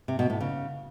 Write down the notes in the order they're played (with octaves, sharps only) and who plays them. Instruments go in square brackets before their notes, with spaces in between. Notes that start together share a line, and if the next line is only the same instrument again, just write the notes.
[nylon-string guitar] C3
B2
A2
C#3